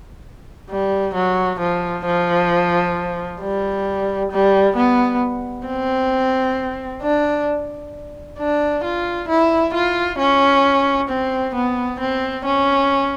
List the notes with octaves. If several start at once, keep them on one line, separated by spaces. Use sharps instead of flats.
G3
F#3
F3
F3
G3
G3
B3
C4
D4
D4
F4
E4
F4
C#4
C4
B3
C4
C#4